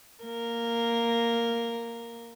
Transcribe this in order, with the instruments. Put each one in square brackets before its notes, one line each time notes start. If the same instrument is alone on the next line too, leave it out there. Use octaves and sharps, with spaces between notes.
[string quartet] A#3 A#4